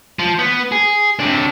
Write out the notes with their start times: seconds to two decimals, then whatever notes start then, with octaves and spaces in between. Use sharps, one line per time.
0.19 F3
0.39 B3
0.72 G#4
1.20 C3 D4